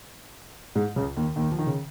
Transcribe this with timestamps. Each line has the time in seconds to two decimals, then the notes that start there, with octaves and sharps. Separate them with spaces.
0.75 G#2 G#3
0.96 C#2 C#3
1.16 D#2 D#3
1.36 D#2 D#3
1.52 F3
1.59 D#3
1.66 C#3